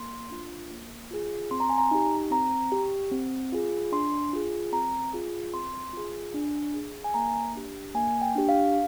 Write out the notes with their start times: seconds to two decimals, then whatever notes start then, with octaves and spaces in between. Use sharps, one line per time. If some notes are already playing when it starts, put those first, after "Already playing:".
Already playing: A#3 C6
0.30 D4 F4
0.71 A#3
1.11 F4 G#4
1.51 C4 C6
1.60 A#5
1.69 G#5
1.78 A#5
1.91 D#4 G4
2.31 C4 A#5
2.72 G4
3.11 C4
3.52 F4 G#4
3.92 D4 C6
4.33 F4 G#4
4.72 C4 A#5
5.13 F4 G#4
5.54 C4 C6
5.93 F4 G#4
6.34 D4
6.74 G#4
7.04 G#5
7.14 A#3 A#5
7.55 D4 G4
7.94 A#3 G#5
8.22 G5
8.35 D4 G4
8.49 F5